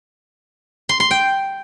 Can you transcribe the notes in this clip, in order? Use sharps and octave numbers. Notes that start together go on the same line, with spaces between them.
C6
C6
G5